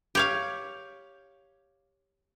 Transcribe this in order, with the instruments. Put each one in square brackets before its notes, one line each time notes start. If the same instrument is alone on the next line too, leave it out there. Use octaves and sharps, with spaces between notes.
[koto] G4 C#5 F5